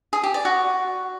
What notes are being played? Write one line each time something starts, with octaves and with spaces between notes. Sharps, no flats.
G#4
G4
D5
F#4